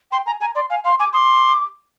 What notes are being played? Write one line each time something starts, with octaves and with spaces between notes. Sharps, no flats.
G5 C6
G#5 A#5
G#5 A#5
D5 C6
F5 G#5
F5 C6
G#5 D6
C6 D6 D#6